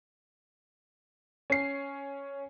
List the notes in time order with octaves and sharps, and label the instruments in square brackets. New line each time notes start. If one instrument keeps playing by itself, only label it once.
[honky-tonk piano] C#4 C7